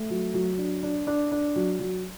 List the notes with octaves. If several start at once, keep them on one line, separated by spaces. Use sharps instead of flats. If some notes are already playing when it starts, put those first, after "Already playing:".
Already playing: A3
F#3
F#3
D4
D4
D4
D4
F#3
F#3